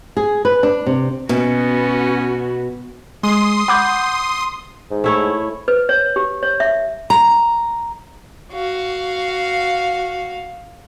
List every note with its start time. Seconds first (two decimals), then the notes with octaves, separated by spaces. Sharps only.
0.17 G#4
0.45 B4
0.63 D4
0.86 C3
1.29 B2 B3 C#4 F#4
3.23 G#3 C6 D#6
3.68 F#5 B5 D6 G6
4.91 G#2
5.04 A3 E4 C#5
5.68 B4
5.89 C#5
6.16 G4
6.43 C#5
6.60 E5
7.10 A#5
8.53 F#4 F5